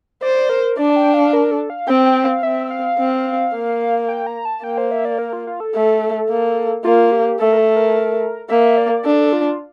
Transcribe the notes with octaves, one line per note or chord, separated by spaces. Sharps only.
C5 D5
A#4
D4 D5
A5
G5
F5
A#4
A4
F5
C4 G5
G5
F5
C4 E5
F5
C4
A#3
G5
A#5
A5
A#3 G5
C5
E5
D5
A#4
F4
F4
A4
A3
A#3
A#3 F4
G4
A3 A4
A#4
A4
A#4
A#3 E5
D5
D4 A4
F4